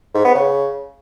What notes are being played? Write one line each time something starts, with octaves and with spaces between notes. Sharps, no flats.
G#2
B3
C#3